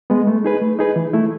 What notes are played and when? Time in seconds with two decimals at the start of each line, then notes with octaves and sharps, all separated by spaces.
0.10 G#3 B3
0.27 A3
0.44 D#4 G#4 B4
0.62 A3
0.79 D#4 G#4 B4
0.96 E3
1.13 A3 E4